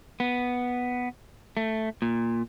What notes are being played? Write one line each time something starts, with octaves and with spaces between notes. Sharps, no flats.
B3
A3
A#2